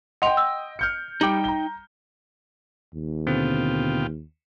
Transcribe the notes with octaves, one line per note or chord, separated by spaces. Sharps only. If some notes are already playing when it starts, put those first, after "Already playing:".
D#5 F#5 G5 C6 F7
E6
F6 G6 C#7
G3 D#4 G5 D6 F#7
A#5 G7
D#2
B2 D3 C4 F4 G5